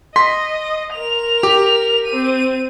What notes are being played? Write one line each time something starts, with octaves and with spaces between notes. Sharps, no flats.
D#5 C6 B6
A#4 F7
G4
C4 D#7